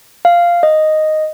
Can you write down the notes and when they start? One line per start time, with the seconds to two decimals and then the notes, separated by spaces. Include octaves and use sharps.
0.25 F5
0.63 D#5